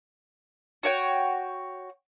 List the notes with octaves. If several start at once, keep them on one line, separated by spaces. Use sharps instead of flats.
F#4 C#5 G5